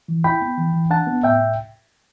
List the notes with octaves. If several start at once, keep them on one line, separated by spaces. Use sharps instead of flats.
E3
E4 G5 B5
B3
E3
E3
D4 F#5 A5
B3
A2 E5 G5